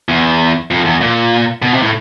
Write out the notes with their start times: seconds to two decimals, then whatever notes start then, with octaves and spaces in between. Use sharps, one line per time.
0.09 E2
0.71 F2
0.85 E2
1.01 A#2
1.62 B2
1.73 C3
1.82 A2